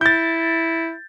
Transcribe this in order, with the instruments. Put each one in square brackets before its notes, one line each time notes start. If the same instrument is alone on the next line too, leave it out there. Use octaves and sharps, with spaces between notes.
[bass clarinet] E4 [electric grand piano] G6 A6